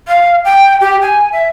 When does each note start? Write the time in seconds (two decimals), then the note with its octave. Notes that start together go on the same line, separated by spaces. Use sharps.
0.08 F5
0.45 G5
0.81 G4
1.02 G#5
1.32 E5